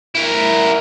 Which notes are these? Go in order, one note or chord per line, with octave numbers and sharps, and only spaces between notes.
E4 A#4